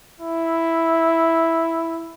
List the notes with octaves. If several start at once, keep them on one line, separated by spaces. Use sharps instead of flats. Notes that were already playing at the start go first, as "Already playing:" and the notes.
E4